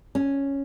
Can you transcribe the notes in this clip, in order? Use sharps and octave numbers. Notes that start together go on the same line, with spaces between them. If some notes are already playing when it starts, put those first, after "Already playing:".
C#4